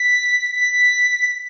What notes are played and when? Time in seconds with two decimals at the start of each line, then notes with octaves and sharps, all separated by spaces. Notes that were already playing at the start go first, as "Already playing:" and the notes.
Already playing: B6
0.56 B6